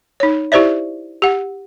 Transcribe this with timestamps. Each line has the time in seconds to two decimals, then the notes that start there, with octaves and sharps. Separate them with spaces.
0.20 D#4 C#5
0.52 E4 G4 C5 D5 E5
1.22 G4 F#5